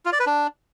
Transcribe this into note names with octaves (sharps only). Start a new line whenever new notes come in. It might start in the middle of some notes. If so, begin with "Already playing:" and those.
F4
D5
B4
D4